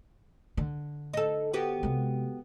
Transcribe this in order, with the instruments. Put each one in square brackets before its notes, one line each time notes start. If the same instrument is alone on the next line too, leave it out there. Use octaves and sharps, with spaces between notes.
[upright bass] D3
[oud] D#4 A4
B3 F#4 G4
[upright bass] C3 G#3